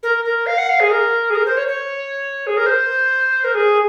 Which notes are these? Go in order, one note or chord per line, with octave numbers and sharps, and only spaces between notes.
A#4
A#4
F5
F#5
F5
G#4
A#4
G#4
A#4
C5
C#5
C#5
G#4
A#4
C5
A#4
G#4